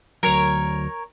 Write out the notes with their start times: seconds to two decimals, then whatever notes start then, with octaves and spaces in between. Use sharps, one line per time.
0.23 D2 F#3 A#4 C#5